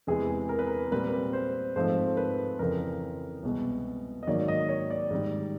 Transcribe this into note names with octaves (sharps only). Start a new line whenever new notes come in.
E2 C3 E3 G#3 G#4
A#4
B4
A#4
A#2 G3 C4 B4
C5
G#2 F3 A3 C4 C5
B4
F2 C#3 E3 A#4
C2 B2 G#3
D#5
G#2 D#3 F#3 A#3 D5
D#5
C#5
D5
G#2 D#3 G3